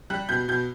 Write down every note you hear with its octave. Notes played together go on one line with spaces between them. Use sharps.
G3 F#6
B2 G6
B2 G6